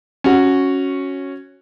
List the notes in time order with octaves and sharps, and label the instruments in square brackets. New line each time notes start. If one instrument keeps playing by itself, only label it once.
[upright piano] C#4 F#4